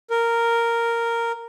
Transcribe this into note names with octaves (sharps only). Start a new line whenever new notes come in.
A#4